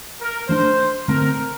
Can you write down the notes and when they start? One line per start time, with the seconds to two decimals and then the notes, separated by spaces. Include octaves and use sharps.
0.20 A#4
0.49 E3 A3 D4 C5
1.08 D3 A3 C4 A#4